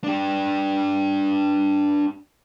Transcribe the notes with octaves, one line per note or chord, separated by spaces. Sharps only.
D4 G4